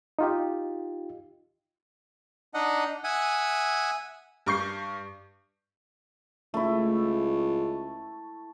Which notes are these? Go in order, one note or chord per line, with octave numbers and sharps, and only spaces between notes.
D#4 F4 G4
D4 D#4 D#5 F#5
E5 F#5 G#5 D#6
G2 C#6 G6 C7
C#2 A3 E4